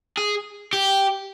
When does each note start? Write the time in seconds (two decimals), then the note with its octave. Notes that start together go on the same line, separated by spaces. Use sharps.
0.17 G#4
0.73 G4